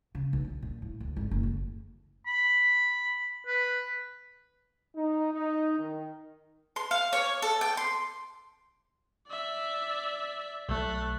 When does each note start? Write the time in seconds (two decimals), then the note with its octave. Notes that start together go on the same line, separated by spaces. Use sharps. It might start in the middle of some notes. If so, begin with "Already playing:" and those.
0.15 C#3
0.33 B1
0.44 D3
0.62 A#2
0.82 A2
1.00 D2
1.16 G#1
1.31 F#1
1.43 D2
2.27 B5
3.47 B4
4.96 D#4
5.33 D#4
5.79 D#3
6.76 C6
6.91 F5
7.13 C#5
7.42 A4
7.61 G5
7.77 C6
9.27 D5 E5
10.69 B1 A3 F#6